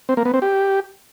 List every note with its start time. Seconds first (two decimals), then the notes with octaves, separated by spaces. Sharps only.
0.09 C4
0.17 A#3
0.25 B3
0.34 C4
0.42 G4